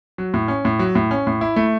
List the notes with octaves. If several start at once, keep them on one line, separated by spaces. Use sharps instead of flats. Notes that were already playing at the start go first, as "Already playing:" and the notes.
F#3
A2
C#4
A2
F#3
A2
C#4
A2
E4
A3